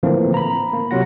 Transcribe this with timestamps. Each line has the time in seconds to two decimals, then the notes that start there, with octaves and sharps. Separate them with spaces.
0.03 A2 D3 E3 F3 A#3 C4
0.34 A#5 B5
0.73 A#3
0.91 C3 F#3 F4 F#5 A#6